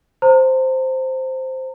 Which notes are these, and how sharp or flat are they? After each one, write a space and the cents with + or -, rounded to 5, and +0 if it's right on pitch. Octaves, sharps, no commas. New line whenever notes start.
C5 +0 A#5 -40